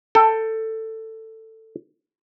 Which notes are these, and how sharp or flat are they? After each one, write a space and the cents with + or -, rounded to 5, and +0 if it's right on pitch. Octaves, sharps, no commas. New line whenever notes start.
A4 +15 G5 +0